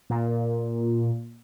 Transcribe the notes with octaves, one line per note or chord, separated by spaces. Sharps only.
A#2